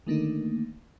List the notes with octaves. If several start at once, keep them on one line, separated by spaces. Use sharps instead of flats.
D3 D#3 A3 A#3 D4 D#4